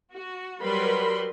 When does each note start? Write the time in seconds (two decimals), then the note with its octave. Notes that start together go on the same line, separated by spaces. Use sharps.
0.13 F#4
0.63 F#3 G3 A#4 B4 B5 C6